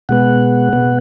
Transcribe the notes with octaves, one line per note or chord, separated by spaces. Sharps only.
B2 G#3 B3 F#5
B2 B3